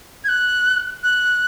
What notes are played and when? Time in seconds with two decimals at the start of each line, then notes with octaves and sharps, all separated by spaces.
0.25 G#6
0.29 F#6
1.03 F#6